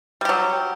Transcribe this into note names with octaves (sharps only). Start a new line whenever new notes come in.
F#3 G3 G4